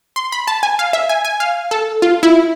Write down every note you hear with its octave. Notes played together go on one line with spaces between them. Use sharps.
C6
B5
A5
G#5
F5
E5
G#5
G#5
F5
A4
F4
E4